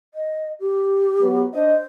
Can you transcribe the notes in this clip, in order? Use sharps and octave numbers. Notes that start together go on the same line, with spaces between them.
D#5
G4
F#3 B3
D4 C5 D#5